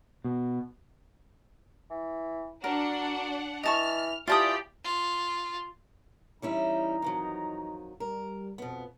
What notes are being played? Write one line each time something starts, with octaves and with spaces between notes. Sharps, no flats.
B2
E3
D4 F#4 A#4 F#5
E3 D#5 A5 C#6 F6
E3 F4 G4 D5 G5 A5 D#6
F4
E3 G3 C#4 D#4 E4 A#5
F2 D#3 F#3
G3 A#4
F2 B2 F3 B3